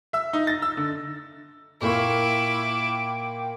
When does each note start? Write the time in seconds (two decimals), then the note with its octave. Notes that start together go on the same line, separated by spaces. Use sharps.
0.13 E5 E6
0.33 D#4
0.47 A6 A#6
0.62 E6
0.77 D3
1.82 A#2 A#3 E4 G5 C#6 D6